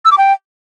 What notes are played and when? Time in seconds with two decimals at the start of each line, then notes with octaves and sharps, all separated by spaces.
0.05 E6
0.11 D6
0.17 G5